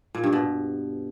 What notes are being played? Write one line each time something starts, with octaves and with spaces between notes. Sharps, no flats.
A#2
G2
B2